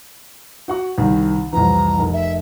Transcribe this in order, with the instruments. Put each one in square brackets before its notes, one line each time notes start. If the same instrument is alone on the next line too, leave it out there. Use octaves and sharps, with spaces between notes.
[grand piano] F#4 F#5 C#6
C2 D#3
[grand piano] C2 F2 E3 [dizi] A#5
[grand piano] F1 A#4
[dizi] E5